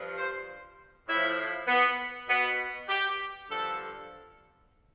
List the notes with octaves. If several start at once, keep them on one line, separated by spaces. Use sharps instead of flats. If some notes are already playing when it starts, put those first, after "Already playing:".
Already playing: G2 F3
C5
A2 F3 E4
B3
B2 B3
G4
G2 D3 F3 A4